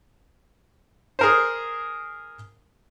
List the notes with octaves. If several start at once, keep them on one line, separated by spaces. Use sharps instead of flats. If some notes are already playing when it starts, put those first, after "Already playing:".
G#4 A#4 C5